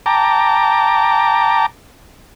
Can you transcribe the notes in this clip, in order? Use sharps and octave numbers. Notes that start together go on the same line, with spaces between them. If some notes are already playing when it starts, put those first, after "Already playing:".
G5 A5 A#5 D6